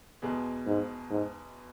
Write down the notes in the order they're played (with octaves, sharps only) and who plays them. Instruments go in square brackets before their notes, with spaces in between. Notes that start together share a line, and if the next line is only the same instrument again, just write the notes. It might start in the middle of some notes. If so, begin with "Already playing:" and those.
[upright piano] E2 B2 G#3
[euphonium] G#2
G#2